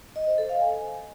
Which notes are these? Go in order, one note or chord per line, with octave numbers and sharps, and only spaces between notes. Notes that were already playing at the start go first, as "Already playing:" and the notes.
D#5
C5
A4
F5
G#5